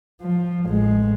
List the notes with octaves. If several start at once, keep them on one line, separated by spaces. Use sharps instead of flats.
F3
A1 G#3